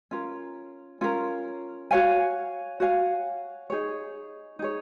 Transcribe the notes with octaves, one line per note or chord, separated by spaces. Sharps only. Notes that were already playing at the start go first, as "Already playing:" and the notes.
C#4 F4 A#4
C#4 F4 A#4
F#4 C#5 F5 G#5
F#4 C#5 F5 G#5
D#4 G#4 C#5
D#4 G#4 C#5